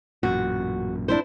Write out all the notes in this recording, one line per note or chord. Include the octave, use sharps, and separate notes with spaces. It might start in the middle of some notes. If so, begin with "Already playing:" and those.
A1 F#2 A#2 F#4
D4 E4 C5